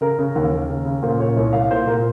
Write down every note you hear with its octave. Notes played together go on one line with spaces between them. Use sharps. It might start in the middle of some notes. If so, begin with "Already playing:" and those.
C#3 A#4
C#3
D#2
D#2
C#3
C#3
A#2 C5
A#2 C#5
C2 C#5
C2 F5
A#2 C5
A#2 A#4